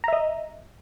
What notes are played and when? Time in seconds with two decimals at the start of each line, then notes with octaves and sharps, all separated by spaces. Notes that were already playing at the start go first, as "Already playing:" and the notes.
0.04 A#5
0.08 E5
0.13 D#5